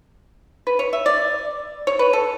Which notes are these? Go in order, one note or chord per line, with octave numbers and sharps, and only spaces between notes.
B4
C#5
E5
D5
C#5
B4
A4